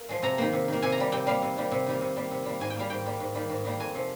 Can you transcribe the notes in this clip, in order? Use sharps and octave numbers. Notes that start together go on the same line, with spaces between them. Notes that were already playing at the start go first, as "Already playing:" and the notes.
Already playing: A#3
F3 G#3
C3 A#5
D#3 A#3
C3
D#3 A#3
C3 G#5
A#5
G3 A#3
C3 G5
G3 A#3 F5
C3
D#3 G3 A#3
C3
D#3 G3 A#3
C3
G3 A#3
C3
G3 A#3
G#2 G#5
G5
G3 A#3 F5
G#2 G5
G3 A#3
G#2
D#3 G3 A#3
G#2
D#3 G3 A#3
F2 G#5
C3 F3